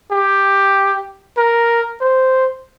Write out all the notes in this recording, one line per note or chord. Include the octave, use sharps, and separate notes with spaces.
G4
A#4
C5